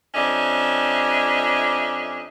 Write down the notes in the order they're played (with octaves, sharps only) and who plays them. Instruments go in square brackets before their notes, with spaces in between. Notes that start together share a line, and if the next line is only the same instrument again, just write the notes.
[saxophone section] F2 C#4 D4 G4 D#5 E5